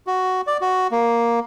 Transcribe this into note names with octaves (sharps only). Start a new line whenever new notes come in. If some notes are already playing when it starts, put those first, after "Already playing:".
F#4
D5
F#4
A#3